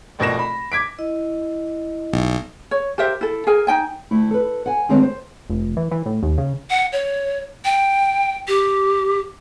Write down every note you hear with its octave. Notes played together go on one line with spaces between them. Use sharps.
F1 A#1 B2 A#4 A#6 E7
B5
D6 G#6 B6 D7
E4 D#5
B1
C#5
G4 A#4 C5 E5
E4 A4
G#4 A#4 G#5
D#4 G5 G#5
D2 A3 E4
A4 B4
F#5 G#5
D3 D#3 G#3 B3 C4 C#5
C5
F1
E3
E3
A2
D#2
C#3
F#5
C#5
G5
G4